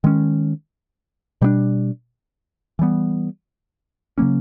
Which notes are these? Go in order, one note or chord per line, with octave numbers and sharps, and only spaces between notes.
D#3 G#3 C#4
B2 G3 B3 D4
E3 G3 B3
C#3 F#3 A#3 C#4